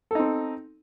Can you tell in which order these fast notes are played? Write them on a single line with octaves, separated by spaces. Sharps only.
A4 D#4 C4